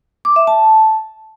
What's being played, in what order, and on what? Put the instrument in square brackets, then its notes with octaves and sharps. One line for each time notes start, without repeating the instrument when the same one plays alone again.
[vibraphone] D6
E5
A5